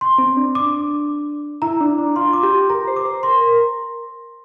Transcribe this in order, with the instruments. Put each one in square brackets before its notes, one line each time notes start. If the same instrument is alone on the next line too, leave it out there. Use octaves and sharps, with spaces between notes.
[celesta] C6
[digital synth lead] C4
D4
[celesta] D6
[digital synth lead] E4 [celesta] A#5
[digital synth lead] D4
D4
[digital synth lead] F4 [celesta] C6
[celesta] D6
[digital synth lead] G4 [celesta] C6
[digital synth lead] A#4 [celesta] A#5
[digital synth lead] C5
[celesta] D6
[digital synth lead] C5
[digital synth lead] A#4 [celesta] C6
[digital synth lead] A#4